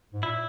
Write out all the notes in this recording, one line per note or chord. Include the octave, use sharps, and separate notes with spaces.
G#2
A#2 E4